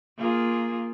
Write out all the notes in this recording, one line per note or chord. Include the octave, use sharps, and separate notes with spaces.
A#3 F4 G#4